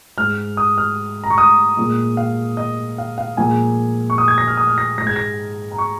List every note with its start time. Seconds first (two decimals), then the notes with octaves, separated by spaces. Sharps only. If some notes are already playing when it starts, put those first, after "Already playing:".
0.18 G#2 G#3 F6
0.57 D#6
0.78 F6
1.24 A#5
1.30 C#6
1.38 D#6
1.77 A#2 G#3
2.17 F5
2.57 D#5
2.98 F5
3.18 F5
3.37 A#2 F3 G#3 G#5
4.10 C#6
4.18 D#6
4.28 G#6
4.38 A#6
4.47 F6
4.57 D#6
4.67 F6
4.78 A#6
4.98 G#2 G#3 A#6
5.07 G#6
5.16 A#6
5.72 A#5
5.78 C#6